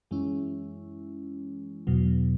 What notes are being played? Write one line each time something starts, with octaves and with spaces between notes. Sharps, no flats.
F#2 E3 G#3 C#4 E4
E2 B2 F#3